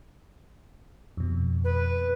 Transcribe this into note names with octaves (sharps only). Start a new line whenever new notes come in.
F2 B2
B4